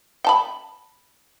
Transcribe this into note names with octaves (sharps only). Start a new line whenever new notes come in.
G5 A5 B5